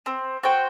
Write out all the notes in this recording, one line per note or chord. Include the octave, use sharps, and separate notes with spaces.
C4
F#4 C5 G5